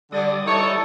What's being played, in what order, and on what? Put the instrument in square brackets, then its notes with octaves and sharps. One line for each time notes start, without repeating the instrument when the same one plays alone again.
[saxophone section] D3 [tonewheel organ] G3 D5 D#6
[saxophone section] E3 D#4 C#5 [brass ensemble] E4 A4